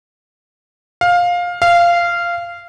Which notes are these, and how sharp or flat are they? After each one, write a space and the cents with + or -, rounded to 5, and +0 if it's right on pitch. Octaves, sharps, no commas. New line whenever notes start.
F5 +15
F5 -15